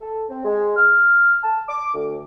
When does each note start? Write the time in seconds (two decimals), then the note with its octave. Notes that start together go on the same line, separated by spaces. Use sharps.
0.01 A4
0.29 C4
0.45 G#3
0.77 F6
1.43 A5
1.68 D6
1.94 D2